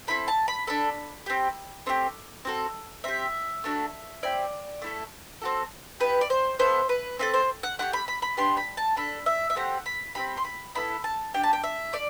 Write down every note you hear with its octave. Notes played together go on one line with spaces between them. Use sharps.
C4 E4 A4 B5
A5
B5
D4 A4 B5
C4 G4
A3 C4 E4 G4
C4 F#4 A4
C4 G4 E5
A3 D4 F#4 A4
C4 E4 G4 D5
A3 E4 A4
C4 F#4 A4
B3 E4 G4 B4
D5
C5
B3 E4 A4 C5
B4
C4 E4 A4 B4
C5
F#5
A3 E4 G4 F#5
B5
B5
B5
B3 D4 G4 C6
B5
A5
D4 A4 B5
E5
E5
A3 C4 G4 F#5
B5
C4 E4 G4 B5
C6
B5
B3 E4 A4 B5
A5
D4 G4 G5
A5
G5
E5
A3 D5